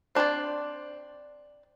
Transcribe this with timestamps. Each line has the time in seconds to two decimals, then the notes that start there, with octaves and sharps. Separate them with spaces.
0.15 C4 D4 B4 C5 D5